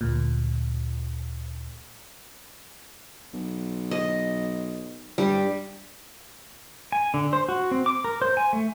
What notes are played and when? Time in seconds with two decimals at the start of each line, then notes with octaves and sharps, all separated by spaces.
0.01 D2 A#2
3.33 B1
3.91 D#5
5.18 G2 G3
6.92 G#5
7.14 D3
7.33 C5
7.49 F#4
7.71 C4
7.86 D6
8.04 A#4
8.22 C5
8.37 G#5
8.53 A3